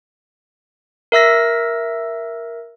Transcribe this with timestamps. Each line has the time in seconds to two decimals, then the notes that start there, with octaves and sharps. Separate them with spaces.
1.12 A#4 E5 E6 A#6